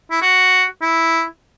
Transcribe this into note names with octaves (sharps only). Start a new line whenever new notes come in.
E4
F#4
E4